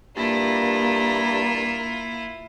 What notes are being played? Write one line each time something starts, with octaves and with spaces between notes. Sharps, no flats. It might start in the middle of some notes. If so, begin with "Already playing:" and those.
G2 A#3 E4 F4